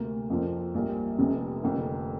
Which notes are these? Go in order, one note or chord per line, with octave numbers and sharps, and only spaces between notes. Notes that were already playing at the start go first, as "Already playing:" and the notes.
Already playing: D2 C3 A#3
F2 F3 A#3
A#1 A#2 G3 A#3
F1 F2 C3
F1 F2 D3 A#3